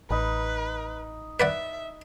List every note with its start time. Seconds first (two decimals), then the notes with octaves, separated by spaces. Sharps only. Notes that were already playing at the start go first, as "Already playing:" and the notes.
0.10 A1 D#4 B4 B5
1.40 B4 D5 E5 F#5